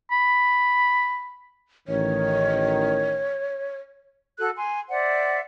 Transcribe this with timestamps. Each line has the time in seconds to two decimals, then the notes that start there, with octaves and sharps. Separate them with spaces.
0.11 B5
1.88 A1 D#3 C#5
4.38 F#4 A4 F#6
4.56 G#5 C6
4.89 C5 D5 E5 F#5